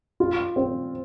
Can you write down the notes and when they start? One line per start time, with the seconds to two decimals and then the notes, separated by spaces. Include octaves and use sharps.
0.20 F4
0.56 C4